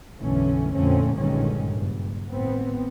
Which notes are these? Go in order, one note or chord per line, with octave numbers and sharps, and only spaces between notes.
B1 F#2 D3 E3 A3 C#4
F2 A#2 D3 A3 C4 C#4
A#1 G2 D3 D#3 G#3 C#4
F#1 G2
G#1 A2 B3 C4